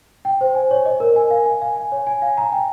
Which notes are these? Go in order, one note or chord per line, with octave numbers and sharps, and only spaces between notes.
G5
C5
G#5
C#5
D#5
A#4
G#5
F5
G#5
F5
G#5
C#5
G#5
F5
A#5
G5